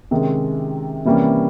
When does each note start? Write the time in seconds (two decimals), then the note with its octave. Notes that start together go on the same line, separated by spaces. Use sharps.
0.11 C3 D#3 G#3 C#4
1.05 C3 E3 G3 A#3 C#4